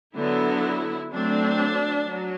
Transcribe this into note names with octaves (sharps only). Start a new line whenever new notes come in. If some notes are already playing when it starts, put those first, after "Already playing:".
D3 F#3 B3 E4
F#3 A3 C4 D4
F#3